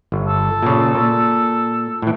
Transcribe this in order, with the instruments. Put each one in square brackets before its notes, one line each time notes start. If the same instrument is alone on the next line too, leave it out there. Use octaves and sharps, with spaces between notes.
[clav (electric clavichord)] G1
[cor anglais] A4
[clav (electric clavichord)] A#2 C#3
A#2
A2 E3